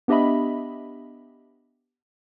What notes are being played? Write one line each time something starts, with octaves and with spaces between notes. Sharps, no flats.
B3 D4 G4 D#5 E5 B5